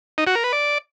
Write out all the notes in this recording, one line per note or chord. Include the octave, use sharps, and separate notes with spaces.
D#4
F#4
A#4
B4
D5